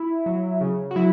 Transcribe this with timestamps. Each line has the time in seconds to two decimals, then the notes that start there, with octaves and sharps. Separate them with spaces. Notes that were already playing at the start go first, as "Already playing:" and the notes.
Already playing: E4
0.26 F#3
0.61 C#3
0.91 F#4
0.96 F#3 E4